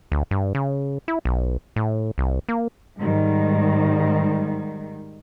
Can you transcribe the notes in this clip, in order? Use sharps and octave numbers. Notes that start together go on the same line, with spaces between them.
D2
G2
C#3
E4
B1
A2
C2
A#3
G#2 D#3 G3